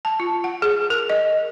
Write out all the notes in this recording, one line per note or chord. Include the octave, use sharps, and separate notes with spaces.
A5
F4
F#5
G#4
A#4
D#5